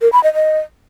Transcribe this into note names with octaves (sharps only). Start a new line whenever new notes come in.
A#4
B5
D#5
D#5